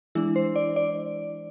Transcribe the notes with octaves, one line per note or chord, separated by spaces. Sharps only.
E3 G#3 D4 E4
C5
D5
D5